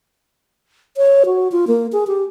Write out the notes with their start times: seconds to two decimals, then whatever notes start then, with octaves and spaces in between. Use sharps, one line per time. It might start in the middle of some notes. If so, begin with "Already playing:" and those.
0.97 C#5
1.26 F#4
1.52 F4
1.67 A#3
1.92 G#4
2.07 G4